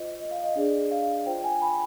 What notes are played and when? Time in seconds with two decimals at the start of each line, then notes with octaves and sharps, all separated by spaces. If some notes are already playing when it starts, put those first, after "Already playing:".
Already playing: F4 C5 D#5
0.20 D#5
0.31 F5
0.43 D#5
0.56 D4 G#4 D5
0.91 F5
1.26 F4 C5 G5
1.44 G#5
1.62 B5